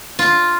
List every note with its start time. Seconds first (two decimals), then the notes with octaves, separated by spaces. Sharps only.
0.19 F4